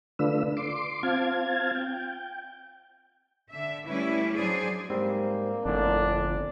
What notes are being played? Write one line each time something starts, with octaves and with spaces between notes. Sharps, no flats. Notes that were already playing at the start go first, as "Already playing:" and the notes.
D3 A3 D4 F4 B4 E6
C6 D6
C4 F4 F5 A5 G#6
G5
D3 E5
G3 A3 C#4 E4 B4
F#3 D4 G#4 C5 D5
G#2 G3 A#3 C4
G1 F2 A2 D4